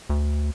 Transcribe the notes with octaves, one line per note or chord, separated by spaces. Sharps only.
D2